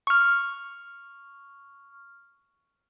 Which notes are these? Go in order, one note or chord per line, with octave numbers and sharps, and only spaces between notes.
C#6 F6